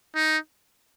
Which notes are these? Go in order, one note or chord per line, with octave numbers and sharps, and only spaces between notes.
D#4